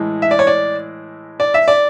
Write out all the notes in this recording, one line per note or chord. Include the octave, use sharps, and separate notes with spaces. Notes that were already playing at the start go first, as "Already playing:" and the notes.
Already playing: A2 E3 G#3
E5
D5
C#5
D5
D5
E5
D5